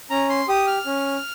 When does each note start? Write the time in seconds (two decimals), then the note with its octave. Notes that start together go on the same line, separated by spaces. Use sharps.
0.10 C#4 A#5
0.29 C6
0.48 G4 D#6
0.67 F6
0.86 C#4